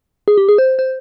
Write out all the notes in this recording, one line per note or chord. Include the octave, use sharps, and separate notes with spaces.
G#4
G4
G#4
C5
C5